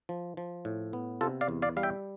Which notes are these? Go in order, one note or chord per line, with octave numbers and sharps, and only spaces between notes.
F3
F3
A2
B3
C3 F4 A4
D5 F5
E2
D5 F5
G3 F5
E5 G5